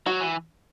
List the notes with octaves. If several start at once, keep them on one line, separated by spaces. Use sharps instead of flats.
F#3 F#4
E3